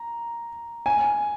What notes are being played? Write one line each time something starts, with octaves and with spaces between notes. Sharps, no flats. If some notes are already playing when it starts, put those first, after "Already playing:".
Already playing: A#5
G#5